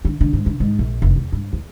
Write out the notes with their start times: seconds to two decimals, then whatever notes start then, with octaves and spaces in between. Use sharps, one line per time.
0.05 D3
0.21 D3
0.33 G#2
0.46 D3
0.60 G#2
0.79 A#1
1.02 F1
1.16 E2
1.32 G2
1.53 E2